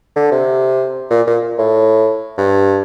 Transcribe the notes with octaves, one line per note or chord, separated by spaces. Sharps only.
D3
C3
A#2
A#2
A2
G2